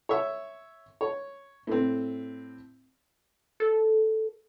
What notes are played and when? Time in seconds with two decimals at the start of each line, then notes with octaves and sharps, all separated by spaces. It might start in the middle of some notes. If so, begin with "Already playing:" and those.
0.09 C#5 E5
1.01 C#5
1.67 A2 C4
3.60 A4